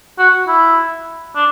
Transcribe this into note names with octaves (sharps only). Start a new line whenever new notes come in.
F#4
E4
D4